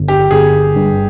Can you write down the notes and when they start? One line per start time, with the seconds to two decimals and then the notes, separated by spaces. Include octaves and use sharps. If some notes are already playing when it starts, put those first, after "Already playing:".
Already playing: G1
0.08 G4
0.31 G1 G#4
0.76 G2